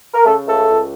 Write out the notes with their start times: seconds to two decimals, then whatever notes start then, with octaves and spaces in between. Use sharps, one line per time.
0.14 A#4
0.25 C#3 A3 A4
0.46 C#2 A3 A4
0.68 C#2